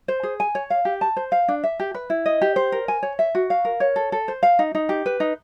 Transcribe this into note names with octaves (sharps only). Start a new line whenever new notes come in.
C5
G#4
G#5
C#5
F5
G4
A5
C5
F5
D4
E5
G4
B4
E4
D#5
G4
C5
A#4
G#5
C#5
E5
F#4
F5
A#4
C#5
A4
A4
C5
F5
D#4
D#4
G4
B4
D#4